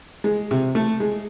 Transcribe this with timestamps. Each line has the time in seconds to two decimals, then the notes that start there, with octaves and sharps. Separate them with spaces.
0.24 G#3
0.51 C3
0.75 A3
1.00 G#3